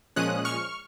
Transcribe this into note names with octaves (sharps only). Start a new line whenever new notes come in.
A#2 F3 G#3 C#4 D#6 F#6
C#6 F6